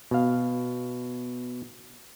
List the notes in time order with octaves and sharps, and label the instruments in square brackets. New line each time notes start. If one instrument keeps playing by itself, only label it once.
[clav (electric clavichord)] B2 F5